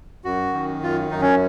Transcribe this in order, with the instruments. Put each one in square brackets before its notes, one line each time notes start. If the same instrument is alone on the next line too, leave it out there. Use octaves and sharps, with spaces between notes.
[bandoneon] F#2 F#4
D#3
F#2 F4
F#2 D#4
C#4